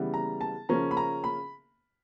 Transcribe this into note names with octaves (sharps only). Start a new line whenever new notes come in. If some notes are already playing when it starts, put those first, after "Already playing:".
Already playing: C#3 E3 G3 B3
A#5
A5
C#3 F3 A#3 C#4 A#5
B5
A#5
B5